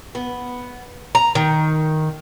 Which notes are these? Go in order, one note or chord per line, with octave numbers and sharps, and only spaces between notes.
B3
A#5
D#3